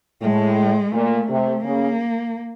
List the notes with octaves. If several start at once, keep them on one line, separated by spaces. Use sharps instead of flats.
A2 G#3
A#2 A3
C3
C#3 A#3